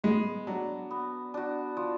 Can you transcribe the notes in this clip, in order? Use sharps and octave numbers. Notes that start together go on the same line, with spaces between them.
G#3 B3
F#3 D4 F#4
B3
D4 F#4
F3